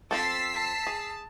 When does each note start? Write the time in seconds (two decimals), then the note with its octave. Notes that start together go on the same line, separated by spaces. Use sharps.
0.11 F3 C4 A4 E6 A6 B6 C7
0.53 A5
0.87 G#4